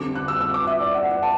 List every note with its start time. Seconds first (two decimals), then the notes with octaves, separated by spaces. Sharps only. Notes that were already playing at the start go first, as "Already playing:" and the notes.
Already playing: D3 G3 C4 D6
0.15 F#6
0.28 E6
0.41 E6
0.54 D6
0.67 E5
0.80 D5
0.94 F#5
1.12 F#5
1.23 A5